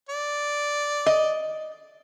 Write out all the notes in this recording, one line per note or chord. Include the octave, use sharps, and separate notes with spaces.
D5
D#5